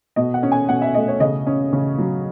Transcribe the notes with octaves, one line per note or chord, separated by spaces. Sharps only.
B2 D#5
F#5
C#4
G#5
B2 F#5
E5
A3 D#5
C#5
C#3 D#5
C#4
C#3
F#3